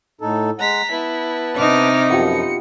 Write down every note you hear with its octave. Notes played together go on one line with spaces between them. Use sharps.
A2 D#4 A4
G#3 F#5 A#5 B6
B3 E4 B4 A5
C3 D4 D#4 D6 F6
F#2 F3 B3 F4 G4 C#7